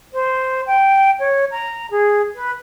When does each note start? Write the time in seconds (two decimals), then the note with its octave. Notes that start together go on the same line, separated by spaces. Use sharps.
0.12 C5
0.66 G5
1.19 C#5
1.51 A#5
1.91 G#4
2.34 B4